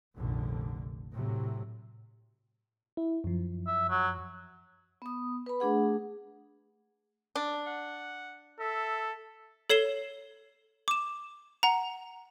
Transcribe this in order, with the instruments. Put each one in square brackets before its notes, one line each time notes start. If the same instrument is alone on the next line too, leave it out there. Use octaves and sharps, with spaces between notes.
[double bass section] F1 A#1 D3
A2 C3 F#3
[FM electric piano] E4
F#2 F3
[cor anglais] E5
F#3
[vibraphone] B3 D#6
B4 B5
A3 D4 G#4 F#5
[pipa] D4
[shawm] F#5
[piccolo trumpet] A4 [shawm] E5
[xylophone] A4 C#5 C7 E7 G7
D6 E7
F#5 A#5